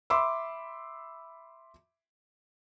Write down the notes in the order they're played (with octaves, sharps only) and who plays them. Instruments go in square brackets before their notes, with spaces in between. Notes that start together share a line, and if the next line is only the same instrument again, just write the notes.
[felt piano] E5 B5 C6 D6 E6